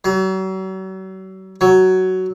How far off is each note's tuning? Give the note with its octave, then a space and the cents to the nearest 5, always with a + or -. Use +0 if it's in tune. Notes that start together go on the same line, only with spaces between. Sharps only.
F#3 +40
F#3 +10